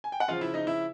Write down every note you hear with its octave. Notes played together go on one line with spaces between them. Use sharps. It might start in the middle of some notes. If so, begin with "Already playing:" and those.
G#5
G5
F#5
C#3 F3 F4 F5
E4 E5
D#4 D#5
E4 E5